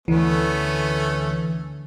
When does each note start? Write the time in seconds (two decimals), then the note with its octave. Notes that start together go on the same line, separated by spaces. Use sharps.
0.08 D2 E3 A3 B3 C#4